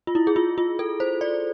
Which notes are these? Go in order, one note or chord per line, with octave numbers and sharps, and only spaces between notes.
F4
E4
G#4
F4
F4
A4
C5
D5